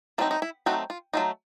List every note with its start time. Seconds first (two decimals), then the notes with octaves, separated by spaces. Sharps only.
0.18 F#3 A3 C4 D#4 F4
0.31 D#4
0.42 E4
0.66 F#3 A3 C4 D#4 F#4
0.90 F4
1.13 F#3 A3 C4 D#4 F4